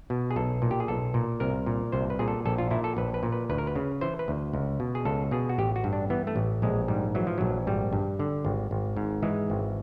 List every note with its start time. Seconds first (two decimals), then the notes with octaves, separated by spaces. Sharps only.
0.10 B2
0.31 G#4
0.36 B1 A4
0.62 A#2
0.71 G4
0.80 G#4
0.88 B1 A4
1.14 A#2
1.40 C2 A#4
1.66 A#2
1.92 C2 C5
2.10 B4
2.19 A#2 G#4
2.28 A4
2.46 A#1 A4
2.58 F4
2.71 A#2 E4
2.84 A4
2.97 A#1 B4
3.14 B4
3.23 A#2
3.32 B4
3.49 D2 B4
3.58 A#4
3.67 B4
3.75 C#3
4.01 E3 C5
4.19 B4
4.28 D2
4.53 C#2
4.80 B2
4.95 G#4
5.05 C#2 A4
5.31 B2 G#4
5.49 F#4
5.58 A1 G4
5.76 F#4
5.84 G2
5.93 D4
6.10 E3 B3
6.27 A3
6.36 A1
6.62 A#1 G#3
6.88 G#2 G3
7.15 E3 F#3
7.27 F3
7.38 A#1 F#3
7.67 G#1 G3
7.93 G2
8.19 D3
8.45 G#1
8.71 G#1
8.97 G#2
9.23 E3 G#3
9.50 G#1